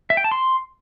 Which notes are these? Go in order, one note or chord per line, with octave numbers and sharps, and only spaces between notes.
E5
G5
A5
C6